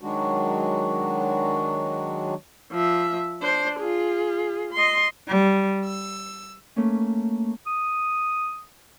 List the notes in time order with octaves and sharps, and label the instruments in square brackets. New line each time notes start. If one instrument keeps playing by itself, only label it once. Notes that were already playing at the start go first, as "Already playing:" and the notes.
[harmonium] D#3 F#3 G#3 D4 F#4
[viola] F3 E5
D4 C5
F4 G#4
D#5 C6
[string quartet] G3
E6
[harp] A3 A#3 C#4
[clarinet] D#6